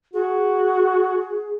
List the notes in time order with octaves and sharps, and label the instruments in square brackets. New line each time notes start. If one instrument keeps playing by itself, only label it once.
[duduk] F#4 [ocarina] G#4